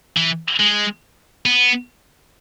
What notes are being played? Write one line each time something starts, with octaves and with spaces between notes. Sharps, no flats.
E3
G#3
B3